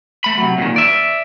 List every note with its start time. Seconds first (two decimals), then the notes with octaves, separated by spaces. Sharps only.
0.24 A3 B5
0.38 C3 F#3
0.58 A#2 D#3
0.76 D5 E5